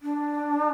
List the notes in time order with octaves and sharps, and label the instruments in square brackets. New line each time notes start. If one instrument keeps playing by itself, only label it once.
[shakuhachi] D4